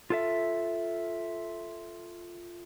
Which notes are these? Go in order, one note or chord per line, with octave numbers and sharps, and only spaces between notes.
F4 A4 E5